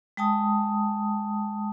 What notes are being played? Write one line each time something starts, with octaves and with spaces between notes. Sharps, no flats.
G#3 G5 A5 D#6